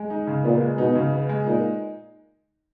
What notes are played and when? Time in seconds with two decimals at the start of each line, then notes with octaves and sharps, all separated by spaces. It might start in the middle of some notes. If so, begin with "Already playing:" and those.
Already playing: G#3
0.10 D#4
0.27 C#3
0.44 A#2 B3
0.61 G#3
0.78 B2 D#4
0.95 C#3
1.12 B3
1.29 G#3
1.46 A#2 D#4